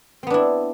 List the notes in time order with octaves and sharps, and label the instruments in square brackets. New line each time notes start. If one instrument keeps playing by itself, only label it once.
[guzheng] C4
B3
D4
E4